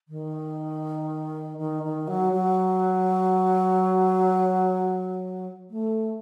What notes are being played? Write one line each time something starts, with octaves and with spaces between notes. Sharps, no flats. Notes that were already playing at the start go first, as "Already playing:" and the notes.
D#3
D#3
D#3
F#3
F#3
A3